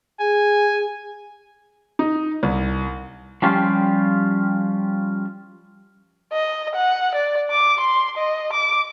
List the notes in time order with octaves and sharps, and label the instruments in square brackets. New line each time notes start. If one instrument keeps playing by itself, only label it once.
[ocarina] G#4 [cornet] G#5
[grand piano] D#4
C2
[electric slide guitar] F3 G3 C#4 F4 G4
[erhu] D#5
F#5
D5
D6
C6
D#5
D6